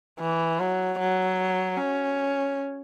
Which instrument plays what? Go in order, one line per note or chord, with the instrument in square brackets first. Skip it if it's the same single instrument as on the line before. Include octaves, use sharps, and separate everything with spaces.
[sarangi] E3
F#3
F#3
C#4